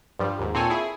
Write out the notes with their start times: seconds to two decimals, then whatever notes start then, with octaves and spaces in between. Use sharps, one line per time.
0.19 G2 F3 G3
0.39 D#2 G#2
0.54 A#2 C4 A4 C#5 G#5
0.70 E4 G#4